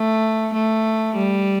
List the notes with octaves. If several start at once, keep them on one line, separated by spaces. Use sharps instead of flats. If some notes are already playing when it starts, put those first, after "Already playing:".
Already playing: A3
A3
G3